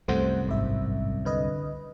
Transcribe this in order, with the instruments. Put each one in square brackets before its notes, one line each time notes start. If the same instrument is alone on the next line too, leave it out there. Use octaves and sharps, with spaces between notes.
[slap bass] C2 F#2 [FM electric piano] A3 C5 F#5
[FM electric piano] A1 G#2 E5
D3 B4 D#5